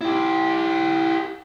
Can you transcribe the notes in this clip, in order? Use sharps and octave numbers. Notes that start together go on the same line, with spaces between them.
E4 G4